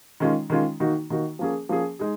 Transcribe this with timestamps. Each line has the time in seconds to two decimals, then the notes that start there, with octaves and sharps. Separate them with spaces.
0.20 D#3 G#3 C#4 F4
0.50 D#3 G#3 C#4 F4
0.80 D#3 A#3 D#4 F#4
1.10 D#3 A#3 D#4 F#4
1.39 F3 A#3 C#4 G#4
1.69 F3 A#3 C#4 G#4
1.99 G#3 D#4 G#4